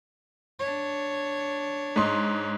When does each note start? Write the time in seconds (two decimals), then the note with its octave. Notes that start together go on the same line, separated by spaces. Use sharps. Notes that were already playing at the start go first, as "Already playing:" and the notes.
0.59 D4 C#5
1.96 G#2 D#5 C6